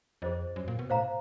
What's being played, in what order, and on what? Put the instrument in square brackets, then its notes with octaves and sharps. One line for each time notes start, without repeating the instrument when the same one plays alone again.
[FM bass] F2 [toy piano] G#4 C5 D#5
[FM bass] F#2
A#2
B2
[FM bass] A2 [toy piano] C5 F5 A#5